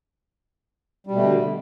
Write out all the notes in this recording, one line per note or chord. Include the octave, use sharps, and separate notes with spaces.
B2 D3 G3 A3